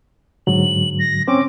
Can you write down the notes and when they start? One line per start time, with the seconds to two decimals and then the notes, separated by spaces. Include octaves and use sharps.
0.47 G#2 D3 F#3 F#7
0.99 A#6
1.28 C4 C#4 C5 D6